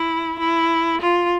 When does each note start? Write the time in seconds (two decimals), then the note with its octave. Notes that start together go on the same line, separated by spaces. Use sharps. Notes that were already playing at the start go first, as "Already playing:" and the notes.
Already playing: E4
0.39 E4
1.01 F4